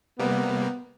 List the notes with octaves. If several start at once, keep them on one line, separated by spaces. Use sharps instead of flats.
C3 G3 A#3 B3